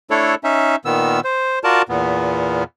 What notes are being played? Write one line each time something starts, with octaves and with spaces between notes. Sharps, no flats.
A3 D4 E4 A4 C#5
C#4 D#4 E5
A#2 D#3 B3 E6
C5
F4 F#4 A#4 D5 A5
E2 A#2 B3